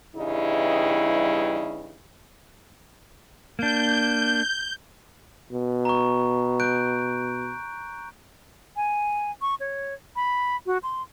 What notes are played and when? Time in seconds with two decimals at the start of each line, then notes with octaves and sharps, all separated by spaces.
0.16 E2 G2 C#3 G3 D#4 E4
3.59 A#3 D4 G6
5.52 B2
5.85 A#5 C#6
6.60 F#6 G6 D7
8.76 G#5
9.41 C#6
9.60 C#5
10.16 B5
10.66 F#4
10.83 C6